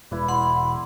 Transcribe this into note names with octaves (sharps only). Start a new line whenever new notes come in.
E1 E4 B4 D5
F#5 B5 C6